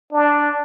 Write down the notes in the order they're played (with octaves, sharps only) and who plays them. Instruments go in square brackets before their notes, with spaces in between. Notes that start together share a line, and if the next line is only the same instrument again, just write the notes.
[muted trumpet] D4